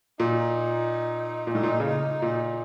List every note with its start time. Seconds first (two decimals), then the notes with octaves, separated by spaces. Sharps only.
0.19 A#2 D#4
1.47 A#2
1.54 A2 D#4
1.63 A#2
1.80 C#3
1.89 D#4
2.22 A#2